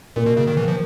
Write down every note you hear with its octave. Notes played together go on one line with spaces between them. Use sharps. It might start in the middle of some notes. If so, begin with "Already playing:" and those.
A#2 A#3
B2
C#3
D#3
E3
F3